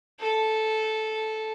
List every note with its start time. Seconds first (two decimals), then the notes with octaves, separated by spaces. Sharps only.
0.20 A4